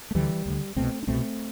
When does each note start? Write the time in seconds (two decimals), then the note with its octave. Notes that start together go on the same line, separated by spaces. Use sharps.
0.11 A3
0.15 D2 D3 E3 G3
0.46 D2 D3
0.76 C2 B2 A3 C4
1.03 D4
1.07 C2 B2 A3 C4